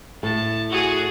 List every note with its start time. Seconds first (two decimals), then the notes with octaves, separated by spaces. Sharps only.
0.23 A2 A5
0.70 F#4 G#4